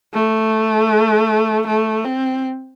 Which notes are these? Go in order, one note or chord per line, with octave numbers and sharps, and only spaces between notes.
A3
A3
C4